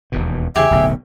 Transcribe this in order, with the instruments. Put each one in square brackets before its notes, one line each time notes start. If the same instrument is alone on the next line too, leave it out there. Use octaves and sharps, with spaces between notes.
[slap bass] E1 D#2 B2
[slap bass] E2 C#3 [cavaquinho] G4 G#4 G#5 [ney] E5
[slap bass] D1 B1 D3